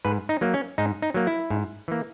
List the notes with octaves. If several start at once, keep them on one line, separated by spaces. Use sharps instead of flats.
G#2 B4
D#4
F#3 A#3
C#4
G#2 D#4
D#4
F#3 A#3
E4
G#2
E3 A#3